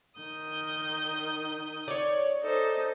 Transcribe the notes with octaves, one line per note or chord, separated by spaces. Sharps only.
D#3 D#6 G6
C#5 D5
D#4 A4 C5